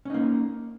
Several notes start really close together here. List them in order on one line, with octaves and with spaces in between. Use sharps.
C#4 D#4 A#3